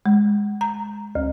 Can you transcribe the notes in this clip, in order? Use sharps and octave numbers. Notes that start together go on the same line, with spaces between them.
G#3
A#5
D2